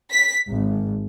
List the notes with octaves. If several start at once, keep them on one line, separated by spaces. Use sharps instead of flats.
B6
G#1